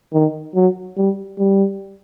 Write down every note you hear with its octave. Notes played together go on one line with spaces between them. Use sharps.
D#3
F#3
G3
G3